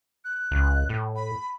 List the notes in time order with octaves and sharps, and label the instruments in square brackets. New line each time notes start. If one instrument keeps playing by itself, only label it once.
[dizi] F#6
[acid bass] C#2
A2
[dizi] B5